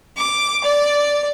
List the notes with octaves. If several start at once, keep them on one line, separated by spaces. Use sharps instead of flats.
D6
D5